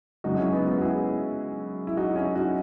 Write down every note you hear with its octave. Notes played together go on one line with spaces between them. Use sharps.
F#2 C#3 G#3 D#4 F#4
C#4 E4
B3 D#4
B3
F#4
E4 G#4
E4
D#4 F#4
C#4 E4
D#4 F#4